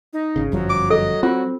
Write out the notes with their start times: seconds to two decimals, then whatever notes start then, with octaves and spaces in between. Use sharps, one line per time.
0.13 D#4
0.36 G#1 C#3
0.52 G1 F#2 F3 F#3
0.70 D6
0.90 A4 D#5
1.23 C4 F4 F#4